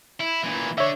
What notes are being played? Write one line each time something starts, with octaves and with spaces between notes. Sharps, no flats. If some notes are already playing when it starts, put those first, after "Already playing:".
E4
A#2 E3
D3 C#5 E5